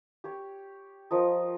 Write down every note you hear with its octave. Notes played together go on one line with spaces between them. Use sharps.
G4 C#5
F3 A#4 D#5